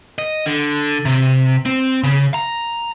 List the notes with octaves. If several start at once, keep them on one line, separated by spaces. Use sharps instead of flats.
D#5
D3
C3
C4
C#3
A#5